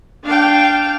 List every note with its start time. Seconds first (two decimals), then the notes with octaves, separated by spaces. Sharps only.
0.24 D4 F5 G5